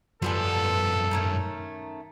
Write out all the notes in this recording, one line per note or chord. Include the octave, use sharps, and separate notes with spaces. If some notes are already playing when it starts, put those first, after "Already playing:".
F#2 F3 G3 B3 A4 G#5
D#3 A3 C#4